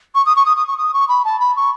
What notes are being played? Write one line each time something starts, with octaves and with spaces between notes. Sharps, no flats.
C#6
D#6
C#6
D#6
D#6
C#6
D#6
C#6
B5
A5
B5
C#6